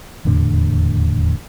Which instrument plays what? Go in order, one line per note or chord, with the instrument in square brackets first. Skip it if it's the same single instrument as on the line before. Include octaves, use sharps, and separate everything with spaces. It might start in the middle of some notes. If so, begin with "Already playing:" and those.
[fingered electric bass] D#1 E2 A2 D3